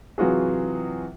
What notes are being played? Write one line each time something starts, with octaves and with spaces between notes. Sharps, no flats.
C3 E3 F#3 F4 F#4 G#4